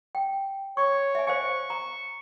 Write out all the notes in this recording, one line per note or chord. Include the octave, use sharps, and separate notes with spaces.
G5
C#5 C#6
E5 G#5
C5 F5 G#5 C#6
A#5